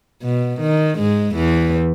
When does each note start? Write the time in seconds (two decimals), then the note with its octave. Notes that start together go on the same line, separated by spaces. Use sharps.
0.23 B2
0.60 D#3
0.97 G#2 G#3
1.35 E2 E3